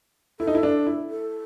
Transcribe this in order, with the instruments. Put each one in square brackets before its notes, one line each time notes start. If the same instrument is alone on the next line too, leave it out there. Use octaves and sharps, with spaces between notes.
[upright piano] E4 [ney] A4
[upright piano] D#4
E4
D4
E4
[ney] A4